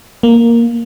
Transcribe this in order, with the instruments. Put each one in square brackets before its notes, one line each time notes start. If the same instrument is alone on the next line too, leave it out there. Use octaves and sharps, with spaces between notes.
[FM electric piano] A#3